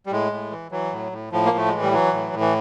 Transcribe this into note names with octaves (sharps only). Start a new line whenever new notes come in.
G3
A2 G#3
A2
E3
E3 F#3
A2
A2
A2 F3
A#3
A2 A3
E3 G#3
G3
E3 F#3
A2
A2
E3